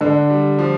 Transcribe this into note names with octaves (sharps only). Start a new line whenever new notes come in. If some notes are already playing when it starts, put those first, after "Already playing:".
D3 D4
G3
F3